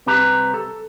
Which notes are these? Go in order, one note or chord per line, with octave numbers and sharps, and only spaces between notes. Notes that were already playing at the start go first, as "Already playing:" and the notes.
C2 C4 G4 B4 A#5
A4